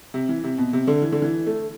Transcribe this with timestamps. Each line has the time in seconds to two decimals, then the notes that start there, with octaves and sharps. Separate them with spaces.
0.14 C3
0.29 E3
0.44 C3
0.58 B2
0.73 C3
0.87 D3
1.02 E3
1.12 D3
1.22 E3
1.47 A3